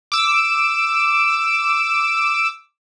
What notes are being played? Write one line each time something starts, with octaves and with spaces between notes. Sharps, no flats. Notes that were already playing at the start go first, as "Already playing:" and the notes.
D6 E6